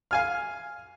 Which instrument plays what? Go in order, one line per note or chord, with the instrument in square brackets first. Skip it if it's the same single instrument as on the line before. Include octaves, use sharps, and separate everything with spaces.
[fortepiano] F5 G#5 F6